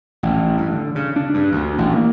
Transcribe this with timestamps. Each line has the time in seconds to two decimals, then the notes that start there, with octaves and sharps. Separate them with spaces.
0.23 A1
0.57 G2
0.73 D3
0.95 C#3
1.16 D4
1.34 G2
1.52 D2
1.78 A1
1.93 A#3